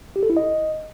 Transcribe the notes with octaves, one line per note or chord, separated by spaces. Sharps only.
G4
A4
E4
D#5